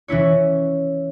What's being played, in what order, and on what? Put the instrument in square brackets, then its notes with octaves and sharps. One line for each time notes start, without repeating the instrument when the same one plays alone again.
[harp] E3 C#4 E4 C#5